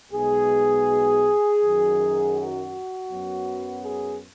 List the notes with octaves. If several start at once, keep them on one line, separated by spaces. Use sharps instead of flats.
B1 B2 G#3 B3 G#4
F#2 D#3 F#3
F#4
F#2 F#3 B3
G#4